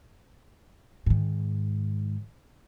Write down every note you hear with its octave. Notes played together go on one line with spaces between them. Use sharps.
G#2 D#3